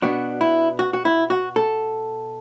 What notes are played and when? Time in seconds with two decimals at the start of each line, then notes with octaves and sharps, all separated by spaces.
0.02 B2 B3 D4 F#4
0.41 E4
0.79 F#4
0.93 F#4
1.05 E4
1.30 F#4
1.56 A4